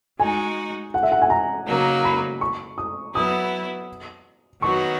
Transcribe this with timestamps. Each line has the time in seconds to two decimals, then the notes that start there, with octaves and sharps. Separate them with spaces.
0.20 G#3 D#4 F#4 G#5
0.94 F#5
1.03 E5
1.12 F#5
1.22 G#5
1.30 A#5
1.67 C#3 F#3 A#3 D#4
2.04 B5
2.41 C#6
2.78 D#6
3.15 F#3 B3 E4 D#6
4.62 D#3 F#3 B3 F#4 C#6